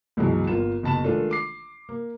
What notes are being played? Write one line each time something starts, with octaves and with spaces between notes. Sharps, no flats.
C#2 G2 B2 E3 F#3 G#3
G1 A#3 F4 E7
F#1 B2 A5 B5 E7
D#3 G#3 A3 D4 F4 A4
D6 C7
A#3